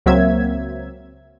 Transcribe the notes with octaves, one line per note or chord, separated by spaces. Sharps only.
C#2 F#3 A#3 C4 E5 G#6